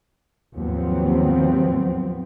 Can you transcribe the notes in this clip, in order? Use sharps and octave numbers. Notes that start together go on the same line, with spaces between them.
D#2 G#2 F3 F#3 B3 C4